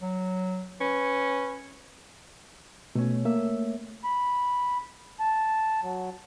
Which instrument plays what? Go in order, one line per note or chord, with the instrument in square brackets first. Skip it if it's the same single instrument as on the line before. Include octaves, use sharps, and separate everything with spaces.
[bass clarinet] F#3
[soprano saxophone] C#4 [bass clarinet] B4
[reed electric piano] B2 [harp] A3 C#4
[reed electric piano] A#3 [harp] E5
[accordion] B5
A5
F#3